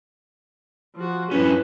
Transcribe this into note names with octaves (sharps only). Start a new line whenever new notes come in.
F3 F#4
G2 C#4 E4 B4